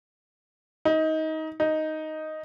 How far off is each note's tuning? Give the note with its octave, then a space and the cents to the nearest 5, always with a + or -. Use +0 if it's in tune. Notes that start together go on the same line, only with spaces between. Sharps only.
D#4 +20
D#4 +0